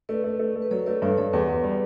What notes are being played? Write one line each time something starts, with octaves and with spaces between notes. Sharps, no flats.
A3 B4 D5
A3
A3
A3
B4
F#3 A4 C#5
A3 B4 D5
G2 A4 C#5
G2 A4 C#5
E2 G4 B4
E2
G3